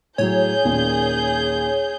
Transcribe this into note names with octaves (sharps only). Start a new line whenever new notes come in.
A2 F#3 G#4 C#5 G6
D#2 A#2 C#4